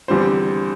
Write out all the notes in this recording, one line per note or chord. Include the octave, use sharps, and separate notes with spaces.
E2 D3 G3 C4 C5